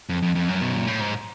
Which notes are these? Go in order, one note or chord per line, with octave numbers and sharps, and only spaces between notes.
F2
F2
F2
F#2
B2
A#2
A2
G#2